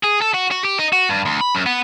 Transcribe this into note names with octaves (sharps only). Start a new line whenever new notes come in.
G#4
A4
F#4
F#4
G4
D#4
F#4
G2
D2
B5
F#2
B3